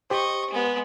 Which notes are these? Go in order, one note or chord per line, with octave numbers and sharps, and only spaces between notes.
G4 C5 D#5 C#6
G#3 B3